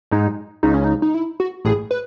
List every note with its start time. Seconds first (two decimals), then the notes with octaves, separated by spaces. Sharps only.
0.11 G#2 G#3 D#4
0.63 C#2 C#3 D#4
0.74 C#4
0.84 D#4
1.02 D#4
1.14 E4
1.40 F#4
1.65 A1 A2 G#4
1.91 B4